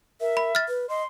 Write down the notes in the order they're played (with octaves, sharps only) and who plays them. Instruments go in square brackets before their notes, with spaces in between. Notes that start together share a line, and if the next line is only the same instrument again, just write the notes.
[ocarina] A#4 [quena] E5
[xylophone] B5
F6 A6
[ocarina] B4
[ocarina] D#5 [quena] C6